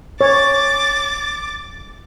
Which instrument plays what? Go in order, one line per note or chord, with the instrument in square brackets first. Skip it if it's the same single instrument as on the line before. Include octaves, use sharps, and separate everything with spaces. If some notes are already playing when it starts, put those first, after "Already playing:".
[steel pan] C#5 [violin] D6 A6